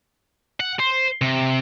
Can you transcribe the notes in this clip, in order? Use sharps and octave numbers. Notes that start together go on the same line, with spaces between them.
F#5
C5
C3